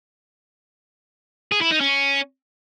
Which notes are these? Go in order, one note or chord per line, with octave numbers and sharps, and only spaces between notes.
G#4
E4
D#4
C#4